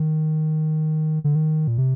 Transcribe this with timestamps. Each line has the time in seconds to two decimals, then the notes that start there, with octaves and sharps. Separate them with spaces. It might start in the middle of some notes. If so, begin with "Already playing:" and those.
Already playing: D#3
1.24 D3
1.35 D#3
1.68 A#2
1.78 C3